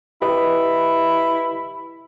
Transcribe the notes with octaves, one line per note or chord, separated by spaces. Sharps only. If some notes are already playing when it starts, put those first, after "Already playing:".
E4 G4 B4 D#5